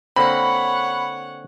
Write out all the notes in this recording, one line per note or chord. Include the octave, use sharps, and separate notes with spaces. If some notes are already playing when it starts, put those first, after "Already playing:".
D3 A#3 C4 C#5 F#5 B5